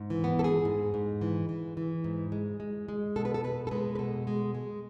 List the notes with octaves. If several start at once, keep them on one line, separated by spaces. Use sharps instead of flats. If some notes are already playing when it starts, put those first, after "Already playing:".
Already playing: G#2
E3
B3
G#2 A4
G#4
G#2
G#2
E3
E3
E3
G#2
G#3
G#3
G#3
B2 A4
B4
A4
B2 B4
A4
G#3 B4
B4
B2 A4
G#3
G#3